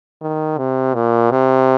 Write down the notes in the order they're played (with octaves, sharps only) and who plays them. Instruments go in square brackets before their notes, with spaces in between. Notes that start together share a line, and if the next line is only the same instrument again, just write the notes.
[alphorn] D#3
C3
A#2
C3